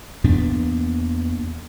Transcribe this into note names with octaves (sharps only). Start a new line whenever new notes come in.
E2 A#2 B3 D4